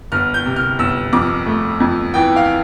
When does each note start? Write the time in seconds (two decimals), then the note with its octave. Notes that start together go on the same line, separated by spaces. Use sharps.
0.12 G1 F6
0.34 G6
0.45 C3
0.56 F6
0.79 G1 E6
1.13 F2 D6
1.46 A3
1.80 F2
2.14 E3 G5
2.36 F5